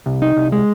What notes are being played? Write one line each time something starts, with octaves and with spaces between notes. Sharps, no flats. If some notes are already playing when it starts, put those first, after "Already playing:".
C2
D#4
C2
G#3